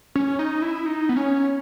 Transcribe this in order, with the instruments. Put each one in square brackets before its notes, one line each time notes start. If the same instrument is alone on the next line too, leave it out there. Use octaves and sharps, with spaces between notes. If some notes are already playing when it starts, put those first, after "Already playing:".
[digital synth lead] C#4
D#4
E4
D#4
B3
C#4